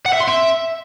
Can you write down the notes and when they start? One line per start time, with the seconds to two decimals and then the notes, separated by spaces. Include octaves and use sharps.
0.06 F#5
0.13 E5
0.21 C6
0.28 E5